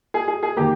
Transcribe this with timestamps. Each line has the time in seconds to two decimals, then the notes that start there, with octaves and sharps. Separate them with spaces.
0.14 G#4
0.28 G#4
0.43 G#4
0.57 D#3 A#3 G4